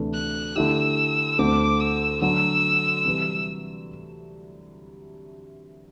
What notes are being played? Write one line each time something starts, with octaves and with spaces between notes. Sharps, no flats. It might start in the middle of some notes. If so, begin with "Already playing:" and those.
Already playing: D2 C3 E3 A3 D4
F#6
D3 A3 E4 G4 E6
D2 D3 A3 C4 D6
E6
D3 F#3 A3 E6
C3 E3 G3